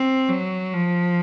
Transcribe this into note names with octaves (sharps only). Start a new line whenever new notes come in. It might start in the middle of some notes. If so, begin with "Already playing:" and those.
Already playing: C4
F#3
F3